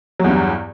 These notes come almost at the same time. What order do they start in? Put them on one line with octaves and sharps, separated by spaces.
F#3 E2 G2